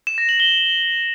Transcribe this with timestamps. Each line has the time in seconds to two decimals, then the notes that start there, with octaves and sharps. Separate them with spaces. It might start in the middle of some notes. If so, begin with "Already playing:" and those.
0.07 E7
0.18 A#6
0.29 F#7
0.40 G7